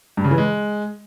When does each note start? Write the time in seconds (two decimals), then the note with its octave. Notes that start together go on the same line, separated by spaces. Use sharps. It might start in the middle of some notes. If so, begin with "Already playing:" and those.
0.17 G2
0.24 C#3
0.31 E3
0.38 G#3